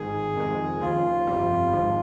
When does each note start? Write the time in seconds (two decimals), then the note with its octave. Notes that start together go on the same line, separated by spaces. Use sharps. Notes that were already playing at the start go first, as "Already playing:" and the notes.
Already playing: G#1 G#2 D#3 G#4
0.36 F2 C3 D#3 G#3
0.80 D#2 C#3 F3 F4
1.26 G1 F2 C3 G3
1.72 G#1 G#2 F3